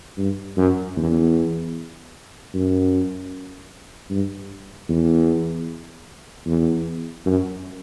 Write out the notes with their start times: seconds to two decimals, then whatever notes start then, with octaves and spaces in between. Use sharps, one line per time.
0.17 G2
0.57 F#2
0.96 E2
2.54 F#2
4.10 G2
4.89 E2
6.46 E2
7.26 F#2